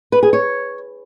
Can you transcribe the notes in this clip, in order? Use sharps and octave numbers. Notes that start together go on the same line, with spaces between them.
B4
G#4
C#5